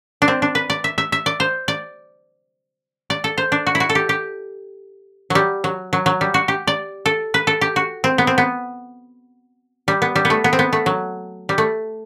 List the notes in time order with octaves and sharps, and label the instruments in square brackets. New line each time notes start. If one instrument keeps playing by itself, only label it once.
[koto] D4
C4
D4
B4
D5
E5
E5
E5
D5
C5
D5
D5
A4
C5
D4
F#4
E4
F#4
A4
G4
G4
F#3 G3
F#3
F#3
F#3
G3
F#4
G4
D5
A4
B4
A4
G4
F#4
C4
B3
C4
B3
G3
B3
G3
B3
A3
B3
C4
B3
A3
F#3
G3
A3